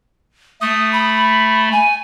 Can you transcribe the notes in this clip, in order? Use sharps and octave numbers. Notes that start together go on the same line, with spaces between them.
A3 D#6
B5
G#5